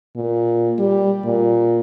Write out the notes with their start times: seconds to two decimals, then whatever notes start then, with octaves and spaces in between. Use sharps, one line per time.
0.16 A#2
0.78 G3
1.24 A#2